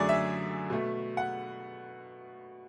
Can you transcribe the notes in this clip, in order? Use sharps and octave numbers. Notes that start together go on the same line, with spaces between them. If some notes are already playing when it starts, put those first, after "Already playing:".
Already playing: F#2 D3 A3 G#4 D5
E5
B2 A3
F#5